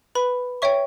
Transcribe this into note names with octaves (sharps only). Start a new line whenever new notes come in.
B4 B5
C#5 E5 G5 C#6